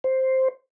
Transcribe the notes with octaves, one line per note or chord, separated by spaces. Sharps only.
C5